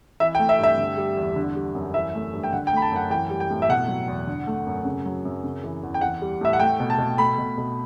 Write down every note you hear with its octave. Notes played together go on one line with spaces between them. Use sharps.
E3 E5
G5
A3
E5
G2
E5
D3
G3
E2
D3
G3
F#2
E3 E5
A3
G2
G5
D3 F#5
G5
A3 B5
A5
F#2 F#5
E3 G5
G3
G5
A2
E5
B2 F#5
F#3
E2
D3
A3
F#2
C#3
F#3
F#2
C#3
E3
E2
G5
E3 F#5
G3
A2 E5
F#5
A3 G5
B2
A5
B2
A3 B5
B2
B2